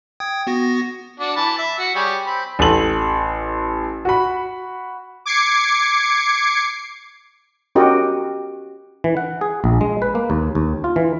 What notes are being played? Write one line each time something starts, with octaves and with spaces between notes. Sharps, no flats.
G5 D#6 G#6
B3 F#4 A#6
D4 F#4
E3 A5 B5
E5
F#4 F#5
G3 G#4 C#5
C4 B5
A1 A4 F#7
F#4 B5
D6 G#6 C7 C#7
C#4 F#4 G4 A#4 D#5
E3
F#5
G#4
A#1
G#3
B4
A#3
D#2
D#2
F4
E3